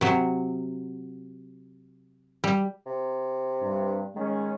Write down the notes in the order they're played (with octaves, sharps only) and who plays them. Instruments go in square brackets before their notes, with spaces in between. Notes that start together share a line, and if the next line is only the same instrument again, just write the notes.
[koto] C3 F#3
G3
[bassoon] C3
[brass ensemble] G2
[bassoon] D#3 [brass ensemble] G#3 C#4